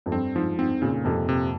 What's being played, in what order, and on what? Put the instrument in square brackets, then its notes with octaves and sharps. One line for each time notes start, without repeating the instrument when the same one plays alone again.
[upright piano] F2
[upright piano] G2 [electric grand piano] C4
[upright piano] G#2 [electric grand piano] F3
[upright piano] G#2 [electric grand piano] C4
[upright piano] A#2 [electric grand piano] C#3
[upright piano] F2 [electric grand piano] C3
[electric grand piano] C3